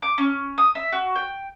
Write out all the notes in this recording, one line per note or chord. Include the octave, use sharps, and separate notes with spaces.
D6
C#4
D#6
E5
F#4
G5